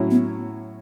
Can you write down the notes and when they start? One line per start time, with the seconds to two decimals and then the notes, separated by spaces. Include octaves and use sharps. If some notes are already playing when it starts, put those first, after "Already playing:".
Already playing: A2 F#3 C#4 E4
0.11 B3